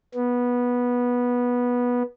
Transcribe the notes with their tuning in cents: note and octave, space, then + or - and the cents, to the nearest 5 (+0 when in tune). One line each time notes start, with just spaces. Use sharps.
B3 -15